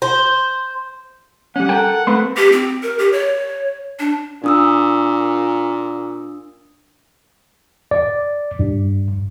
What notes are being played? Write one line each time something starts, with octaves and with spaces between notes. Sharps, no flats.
C5
G3 C#4 F#5
A4 A#4 G5
A3 A#3 C4 B4
G4
C4
A#4
G4
C#5
D4
A#2 D4 D#6 E6
D5
G2